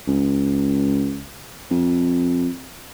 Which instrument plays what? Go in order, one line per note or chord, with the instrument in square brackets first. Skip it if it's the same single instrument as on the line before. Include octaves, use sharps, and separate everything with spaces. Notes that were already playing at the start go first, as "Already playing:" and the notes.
[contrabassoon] C#2
F2